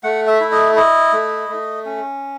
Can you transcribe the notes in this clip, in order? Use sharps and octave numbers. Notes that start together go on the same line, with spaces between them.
A3 F#5
E5
E4
D#5
E4 D#5
A3
A3
C#4